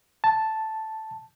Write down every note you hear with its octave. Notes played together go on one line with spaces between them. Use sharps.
A5